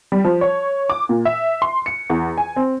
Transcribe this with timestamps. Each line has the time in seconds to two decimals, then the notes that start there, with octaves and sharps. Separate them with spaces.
0.12 G3
0.25 F3
0.41 C#5
0.90 D6
1.09 A#2
1.25 E5
1.62 C6
1.86 C#7
2.10 E2
2.38 G#5
2.56 C4